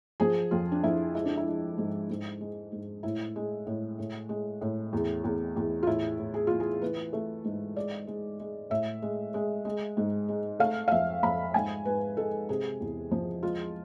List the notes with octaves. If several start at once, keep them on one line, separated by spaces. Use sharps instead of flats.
F3 G#4
F2 F4
D4
F2 E4
G#3 E4
D4
E4
G#3
G#2
G#2
G#3
G#2
A2 E4
G#3
A2
A2
G#3
A2
E2
E2
E2
F4
A2 E4
A2
G#4
E3 F4
G#4
E3 B4
A3
G#2
G#3 D5
G#3
G#3
A2 E5
G#3
G#3
G#3
G#2
G#3
A3 F5
F5
F2 E5
F2 B5
G#2 G#5
G#2 B4
G#3 A4
C3 G#4
E2
F3
G#3 F4